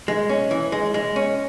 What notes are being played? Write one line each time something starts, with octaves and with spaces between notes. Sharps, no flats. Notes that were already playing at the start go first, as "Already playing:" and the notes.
G#3
C#4
E3
G#3
G#3
C#4